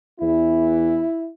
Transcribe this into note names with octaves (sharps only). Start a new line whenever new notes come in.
E2 E3 E4